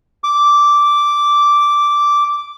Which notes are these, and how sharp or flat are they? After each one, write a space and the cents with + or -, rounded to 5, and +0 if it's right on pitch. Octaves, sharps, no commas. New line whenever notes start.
D6 -5